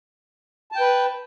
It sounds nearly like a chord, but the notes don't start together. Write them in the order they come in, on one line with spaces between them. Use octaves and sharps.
A5 G5 B4